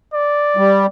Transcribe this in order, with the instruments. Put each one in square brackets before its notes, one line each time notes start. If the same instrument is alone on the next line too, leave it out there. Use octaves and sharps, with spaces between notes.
[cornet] D5
[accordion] G3